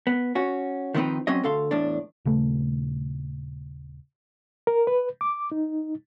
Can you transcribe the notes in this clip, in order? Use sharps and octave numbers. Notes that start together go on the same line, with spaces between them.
B3
C#4 F#4
D#3 F3 B3 C4 D#4 B4
F#3 C4 C#4 D#5
D2 A4 F5 C6
E2 A2 D4
D#1 C#3 A3
A#4
B4
D6
D#4